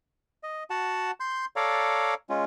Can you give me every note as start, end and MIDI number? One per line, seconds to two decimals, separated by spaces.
0.43 0.64 75
0.70 1.11 66
0.70 1.11 78
0.70 1.11 81
1.20 1.45 84
1.20 1.45 91
1.56 2.14 69
1.56 2.14 73
1.56 2.14 74
1.56 2.14 77
1.56 2.14 82
2.30 2.45 56
2.30 2.45 61
2.30 2.45 65